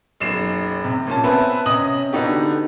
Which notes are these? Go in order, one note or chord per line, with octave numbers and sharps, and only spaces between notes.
F#1 B1 C7 E7
C3
A#2 C#4 A5
B3 C4 B4 E5 G#5 A5
C3 C#4 D#5 D#6 F#7
D3 B3 D#4 F#4 G4